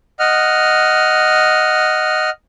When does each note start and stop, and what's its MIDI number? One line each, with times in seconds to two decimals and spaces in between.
0.19 2.30 75
0.19 2.30 78
0.19 2.30 89